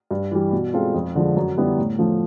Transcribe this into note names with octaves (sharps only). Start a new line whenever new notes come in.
G2
E3 G3
B2
G#3 C4 F4 A4
F2
D3 F3 G#3
F#2
D3 G3 B3 E4
A2
F3 A3